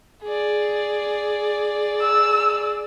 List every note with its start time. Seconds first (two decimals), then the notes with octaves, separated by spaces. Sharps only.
0.23 G#4 D5
2.01 E6